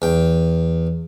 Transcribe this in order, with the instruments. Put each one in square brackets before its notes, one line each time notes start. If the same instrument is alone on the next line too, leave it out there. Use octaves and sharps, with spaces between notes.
[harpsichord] E2 G5